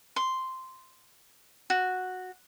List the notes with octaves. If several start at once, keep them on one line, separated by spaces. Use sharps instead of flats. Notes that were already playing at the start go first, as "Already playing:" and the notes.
C6
F#4